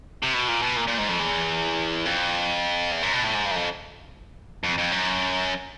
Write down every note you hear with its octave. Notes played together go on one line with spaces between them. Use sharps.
C3
B2
A#2
B2
A#2
A#2
G#2
F2
E2
F2
E2
F#2
B2
A2
G#2
G2
F#2
F2
F2
F2
F#2